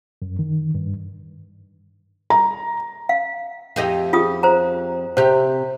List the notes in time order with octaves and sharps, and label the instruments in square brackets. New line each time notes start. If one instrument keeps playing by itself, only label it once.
[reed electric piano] F#2
D#3
G2
[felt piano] A#5
[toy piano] F5
[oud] F2 G4 D#5
[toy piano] F4 G#4 D#6
C5 A#5
[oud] C3 G4 [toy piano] C5